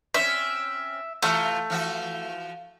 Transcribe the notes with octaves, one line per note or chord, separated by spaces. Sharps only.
C4 C#4 E5
C3 E3 A3 F4
E3 F3 F#4